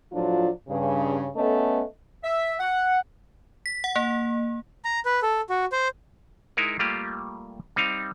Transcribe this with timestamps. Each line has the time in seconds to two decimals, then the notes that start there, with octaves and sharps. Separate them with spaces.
0.12 A2 F3 F#3 D4 F4
0.68 G2 C#3
1.35 A3 B3 C#4 A4 D#5
2.24 E5
2.60 F#5
3.66 B6
3.84 F#5
3.96 A#3
4.85 A#5
5.05 B4
5.23 A4
5.50 F#4
5.72 C5
6.57 G#3 D#4 E4 A#4
6.79 G3 A3 A#3 F4 G4
7.76 G3 C4 D#4 F5